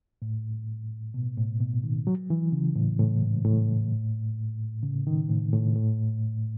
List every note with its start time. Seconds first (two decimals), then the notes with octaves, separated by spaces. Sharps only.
0.22 A2
1.14 B2
1.37 A2
1.61 B2
1.84 D#3
2.07 F#3
2.30 E3
2.52 C#3
2.76 A2
2.99 A2
3.22 G#2
3.45 A2
3.68 A2
4.83 C#3
5.07 D#3
5.29 A2
5.53 A2
5.75 A2